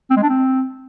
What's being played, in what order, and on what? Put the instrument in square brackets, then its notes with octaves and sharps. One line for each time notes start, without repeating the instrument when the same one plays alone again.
[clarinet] C4
G#3
D4
C4